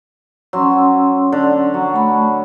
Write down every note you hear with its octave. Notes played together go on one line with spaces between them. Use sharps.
F#3 C#4 C6 E6
D3
F#3
A3 B5